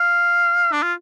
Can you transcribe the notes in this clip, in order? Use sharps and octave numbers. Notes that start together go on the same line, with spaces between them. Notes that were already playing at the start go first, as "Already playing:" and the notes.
Already playing: F5
D4
F4